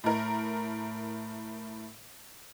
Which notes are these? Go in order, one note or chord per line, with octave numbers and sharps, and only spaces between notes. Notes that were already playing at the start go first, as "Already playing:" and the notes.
A2 A#4